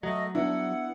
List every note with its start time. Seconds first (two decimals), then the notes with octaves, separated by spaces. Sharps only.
0.03 F#3 A3 D#5
0.35 B3 D4 E4 F#5